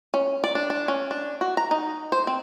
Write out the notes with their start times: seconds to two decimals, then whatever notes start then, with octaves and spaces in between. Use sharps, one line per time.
0.14 C#4
0.44 D5
0.55 D4
0.70 D4
0.88 C#4
1.11 D4
1.41 F#4
1.57 A#5
1.71 D#4
2.12 C5
2.27 C4